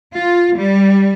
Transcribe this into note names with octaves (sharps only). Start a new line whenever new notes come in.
F4
G3